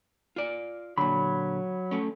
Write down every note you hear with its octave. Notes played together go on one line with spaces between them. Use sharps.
F4 D5
A#2 D3 F#3 B5
A3 C#4